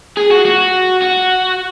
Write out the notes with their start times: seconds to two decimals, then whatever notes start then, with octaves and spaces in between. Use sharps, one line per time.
0.17 G#4
0.31 F#4
0.45 F#4
1.02 F#4